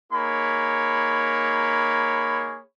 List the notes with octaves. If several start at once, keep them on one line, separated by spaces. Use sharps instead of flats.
A#3 D#4 G#4 C#5 B5